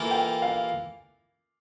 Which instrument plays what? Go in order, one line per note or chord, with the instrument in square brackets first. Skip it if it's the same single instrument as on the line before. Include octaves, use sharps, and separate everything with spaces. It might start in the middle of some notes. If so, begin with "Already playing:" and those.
Already playing: [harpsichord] E3 A#3 F4 A4
[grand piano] G5
F5